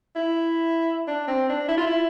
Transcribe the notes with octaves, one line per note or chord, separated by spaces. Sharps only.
E4
D4
C4
D4
E4
F4
E4